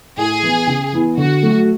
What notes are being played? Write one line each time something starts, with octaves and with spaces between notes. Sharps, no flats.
A2 G#4
E3 B3 E4
C#3
E3 B3 E4
D3 F#4
F#3 A3